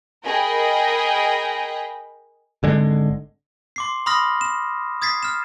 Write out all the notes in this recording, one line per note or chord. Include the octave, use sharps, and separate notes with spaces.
G#4 A#4 D#5 G5 B5
G#1 D3 G#3
C6 D6 C7
B5 C6 D#6 F6 A#6
E7
D#6 G#6 A6 B6 C7
F6 E7